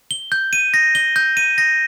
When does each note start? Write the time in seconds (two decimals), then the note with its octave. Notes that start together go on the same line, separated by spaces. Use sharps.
0.11 G7
0.32 G6
0.53 D#7
0.74 A#6
0.95 G7
1.16 G6
1.37 D#7
1.58 A#6